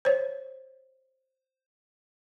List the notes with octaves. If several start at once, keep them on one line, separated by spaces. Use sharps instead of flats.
C5 C#5